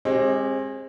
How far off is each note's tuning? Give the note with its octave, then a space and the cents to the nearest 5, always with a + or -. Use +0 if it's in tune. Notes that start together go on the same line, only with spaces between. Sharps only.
G#3 -15 C4 +35 G4 +0